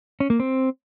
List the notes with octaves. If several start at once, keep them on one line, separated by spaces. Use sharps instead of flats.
C#4
A#3
C4